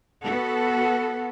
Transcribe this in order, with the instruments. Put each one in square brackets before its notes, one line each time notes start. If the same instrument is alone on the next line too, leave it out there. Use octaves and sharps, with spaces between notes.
[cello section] B3 F#4 A4 [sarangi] F#5